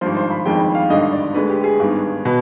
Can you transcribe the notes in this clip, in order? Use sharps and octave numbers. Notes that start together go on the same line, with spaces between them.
G#1 G2 F3 C5
C5
B5
G1 F2 D#3 G#3 G5
F5
G#1 G2 D3 D#5
D5
D2 D3 G#3 B4
G4
G4
G#4
G#1 G2 D#3 B3
B2 B3